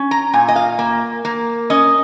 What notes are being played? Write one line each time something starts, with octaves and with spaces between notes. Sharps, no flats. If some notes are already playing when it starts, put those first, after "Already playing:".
Already playing: C#4
A#5
A#2 G#5
D#5
F5
A#3
A#3
C#4 D#5